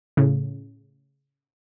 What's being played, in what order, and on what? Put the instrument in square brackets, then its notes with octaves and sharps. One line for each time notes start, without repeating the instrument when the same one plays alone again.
[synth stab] A2 C#3